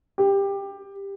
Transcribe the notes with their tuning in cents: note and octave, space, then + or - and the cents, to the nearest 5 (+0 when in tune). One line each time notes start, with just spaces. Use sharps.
G4 +15